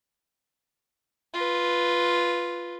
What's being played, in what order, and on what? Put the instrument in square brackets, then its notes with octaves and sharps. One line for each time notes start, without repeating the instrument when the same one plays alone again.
[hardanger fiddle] F4 B4